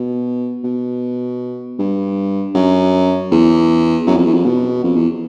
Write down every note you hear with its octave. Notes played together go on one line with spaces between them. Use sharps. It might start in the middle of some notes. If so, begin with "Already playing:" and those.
Already playing: B2
B2
G2
F#2
E2
F#2
F2
E2
F2
B2
F2
E2